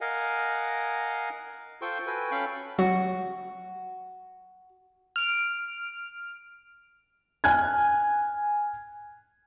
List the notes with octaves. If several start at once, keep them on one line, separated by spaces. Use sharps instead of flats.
A#4 D#5 F5 F#5 G#5
F4 A4 C5 G5 C6 C#6
F#4 A4 B4 G5 G#5
C#4 A4 F5 G5 B5 C#6
F#3 F#4
F6 D7
G#5 F6 F#6 G#6